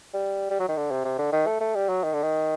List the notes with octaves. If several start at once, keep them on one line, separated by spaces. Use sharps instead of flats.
G3
G3
F#3
D#3
D3
C3
C3
D3
D#3
A3
A3
G3
F#3
D#3
D3
D#3